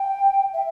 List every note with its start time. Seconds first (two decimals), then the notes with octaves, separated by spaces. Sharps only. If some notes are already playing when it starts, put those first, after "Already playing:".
Already playing: G5
0.53 E5